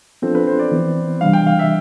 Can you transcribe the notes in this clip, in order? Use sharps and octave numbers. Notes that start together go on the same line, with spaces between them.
F3 B3 C4 D4 F4 A4
B4
C5
D5
E3 B3 E4
C3 E3 G3 D4 F5
G5
F5
E5